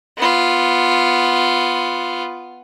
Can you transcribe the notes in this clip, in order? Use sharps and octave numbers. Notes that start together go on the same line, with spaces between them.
B3 F4